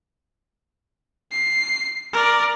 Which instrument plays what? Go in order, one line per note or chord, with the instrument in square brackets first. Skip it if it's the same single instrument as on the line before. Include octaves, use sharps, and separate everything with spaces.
[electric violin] C7
A#4 D5